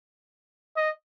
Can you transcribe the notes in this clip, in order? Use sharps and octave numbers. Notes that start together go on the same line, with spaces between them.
D#5